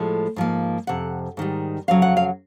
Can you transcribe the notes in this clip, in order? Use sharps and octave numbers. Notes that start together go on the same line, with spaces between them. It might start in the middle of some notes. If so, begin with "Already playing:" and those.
Already playing: A2 F3 G#3
G#2 F3 A#3
F2 C3 F#5
G#2 D#3 G3
F2 C#3 F#3 F5
F#5
F5